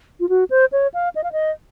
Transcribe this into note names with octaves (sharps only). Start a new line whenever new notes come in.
F4
F#4
C5
C#5
F5
D#5
F5
D#5